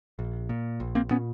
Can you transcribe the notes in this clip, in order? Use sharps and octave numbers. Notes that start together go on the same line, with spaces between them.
A#1
A#2
A#1
A#3 C4
A#2 B3 C#4